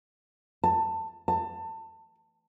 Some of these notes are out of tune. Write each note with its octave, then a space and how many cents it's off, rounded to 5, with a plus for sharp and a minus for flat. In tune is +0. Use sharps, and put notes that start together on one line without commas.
A5 +20
A5 +25